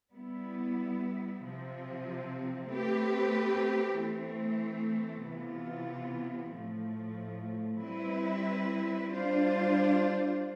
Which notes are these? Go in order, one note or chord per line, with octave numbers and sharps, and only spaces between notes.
G3 B3 E4
C3 F3 C4
A3 C4 G4 B4
E3 A3 C4
C3 E3 B3 F4
A2 F3 A3
G3 C4 E4 B4
G3 D4 F4 C5